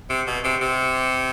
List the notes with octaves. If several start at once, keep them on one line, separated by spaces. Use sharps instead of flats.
C3
B2
C3
C3